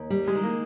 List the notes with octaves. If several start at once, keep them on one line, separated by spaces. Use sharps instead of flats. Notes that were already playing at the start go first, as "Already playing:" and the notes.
Already playing: D#2
G3
G#3
D#3
A#3